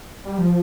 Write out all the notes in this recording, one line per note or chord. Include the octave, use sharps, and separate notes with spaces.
G3
F3